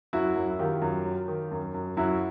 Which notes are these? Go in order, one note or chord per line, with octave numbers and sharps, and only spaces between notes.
F#2 E4 F#4
F#2
D#3 F4 G4
F#2
F#3
D#3
F#2
F#2
F#2 E4 F#4